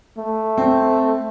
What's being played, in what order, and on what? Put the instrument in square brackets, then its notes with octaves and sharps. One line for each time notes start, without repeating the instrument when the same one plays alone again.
[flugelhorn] A3
[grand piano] C4